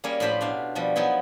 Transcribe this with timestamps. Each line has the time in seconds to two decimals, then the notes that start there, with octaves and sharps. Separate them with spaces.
0.04 G3 A#3 C#4 G#4 A#4 C#5
0.20 A2 F3 F4 G4 C5 B5
0.41 B2 D4 F5
0.75 B2 F3 G3
0.96 F3 F#3 B3 D#4 E4